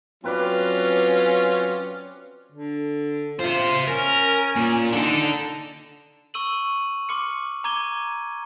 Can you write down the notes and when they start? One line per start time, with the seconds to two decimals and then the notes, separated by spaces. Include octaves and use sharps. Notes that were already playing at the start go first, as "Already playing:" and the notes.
0.24 F#3 C4 C#4 F4 B4 D5
2.52 D3
3.39 F4 C5 E5
3.87 C#4 A#4
4.56 A#2
4.93 D4 D#4 A4
6.34 C#6 E6 D#7 F#7
7.09 C6 D6 F6 C#7
7.64 A#5 D6 G#6 D#7 G7